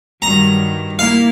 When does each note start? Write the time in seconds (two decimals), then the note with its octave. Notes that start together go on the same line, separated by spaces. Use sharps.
0.22 G2 D#3 F#3 A#5
0.99 A#3 E4 F5